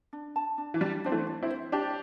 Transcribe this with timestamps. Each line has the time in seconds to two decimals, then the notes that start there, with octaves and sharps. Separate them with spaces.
0.13 D4
0.36 A5
0.58 D4
0.74 E3
0.81 G3 D4
1.04 C4 D4
1.12 E3 A3
1.27 D4
1.42 C4 E4
1.50 C5
1.72 D4 G4 A5